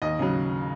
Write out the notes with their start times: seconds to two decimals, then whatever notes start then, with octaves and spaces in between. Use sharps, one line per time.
0.02 D#2 D#5
0.19 C#3 F#3